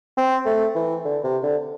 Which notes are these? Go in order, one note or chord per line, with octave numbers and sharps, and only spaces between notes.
C4
A3
E3
D3
C3
D3